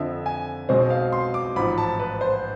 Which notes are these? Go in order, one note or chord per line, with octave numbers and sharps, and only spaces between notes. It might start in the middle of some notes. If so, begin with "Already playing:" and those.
Already playing: F2 D3 F3 E5
G#5
B1 B2 G#3 C4 C5
F5
C6
D6
A1 G#2 F3 B5
A5
B4
C5